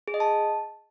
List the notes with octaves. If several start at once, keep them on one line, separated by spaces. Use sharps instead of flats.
G#4
D#5
A5